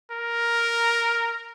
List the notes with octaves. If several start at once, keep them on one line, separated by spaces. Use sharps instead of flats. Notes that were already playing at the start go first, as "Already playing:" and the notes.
A#4